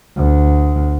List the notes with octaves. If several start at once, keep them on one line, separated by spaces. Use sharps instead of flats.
D2